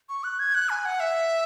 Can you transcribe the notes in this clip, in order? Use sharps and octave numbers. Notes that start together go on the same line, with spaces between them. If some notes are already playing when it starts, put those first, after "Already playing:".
C#6
F#6
G#6
F#6
G#5
F#5
E5